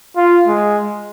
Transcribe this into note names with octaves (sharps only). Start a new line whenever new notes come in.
F4
G#3